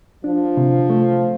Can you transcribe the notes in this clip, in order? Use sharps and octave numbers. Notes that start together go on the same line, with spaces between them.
F3 D4
C3
A3